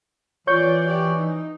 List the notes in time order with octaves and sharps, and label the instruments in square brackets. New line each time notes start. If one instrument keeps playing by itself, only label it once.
[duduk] E3 [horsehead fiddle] F4 D5 [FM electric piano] C#5 C#6 G6
[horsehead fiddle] G4 D5
D#4